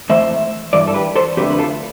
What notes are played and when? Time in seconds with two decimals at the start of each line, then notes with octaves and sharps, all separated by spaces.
0.10 F2 E3 A3 C5 E5
0.73 G2 E3 D5
0.87 A4
0.94 G4 B4
1.16 A4 C5
1.37 F2 D3 A3 G4 B4
1.50 B4
1.59 F4 A4